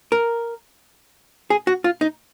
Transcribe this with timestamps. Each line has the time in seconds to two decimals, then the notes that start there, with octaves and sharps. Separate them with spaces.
0.12 A#4
1.50 G#4
1.67 F#4
1.84 F4
2.01 D#4